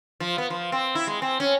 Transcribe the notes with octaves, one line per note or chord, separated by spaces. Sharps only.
F3
B3
F3
C4
E4
G#3
C4
C#4